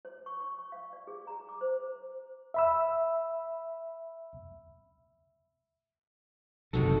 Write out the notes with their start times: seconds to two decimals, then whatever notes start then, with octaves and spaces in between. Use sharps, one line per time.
0.05 C#5
0.26 C#6
0.40 C#6
0.59 C#6
0.72 F5
0.93 D5
1.07 G#4
1.27 A#5
1.49 D6
1.61 C5
2.54 E5 B5 E6
6.73 F#1 C3 D#3 D#4 F#4 A4